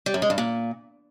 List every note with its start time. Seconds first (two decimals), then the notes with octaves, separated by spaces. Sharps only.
0.06 G3
0.14 F#2
0.22 G#3
0.30 G2
0.38 A#2